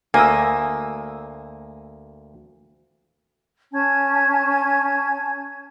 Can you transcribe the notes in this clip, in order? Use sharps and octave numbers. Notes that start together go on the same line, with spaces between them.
D2 A#3 G#5 D#6 E6
C#4 G#5 A5 G#6